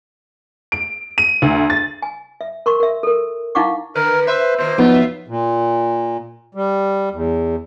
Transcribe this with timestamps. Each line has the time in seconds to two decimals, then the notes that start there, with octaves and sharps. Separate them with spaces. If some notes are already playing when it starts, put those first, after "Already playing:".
0.72 D7
1.18 D#7
1.42 D2
1.70 A6
2.02 G#5
2.41 E5
2.66 A#4 C6 C#6
2.80 A#4 E5
3.03 A4 A#4
3.55 D#4 E4 F5 F#5 C#6 D6
3.95 D3 A#4 B4
4.27 B4 C5 E5
4.58 A#2 D#3 A#3 C5
4.78 F3 F#3 B3 D#4 F4
4.93 E5
5.28 A#2
6.55 G3
7.12 E2